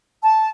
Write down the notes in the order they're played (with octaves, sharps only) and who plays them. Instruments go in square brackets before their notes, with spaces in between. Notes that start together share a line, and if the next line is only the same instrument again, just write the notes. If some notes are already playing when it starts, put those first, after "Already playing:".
[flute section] A5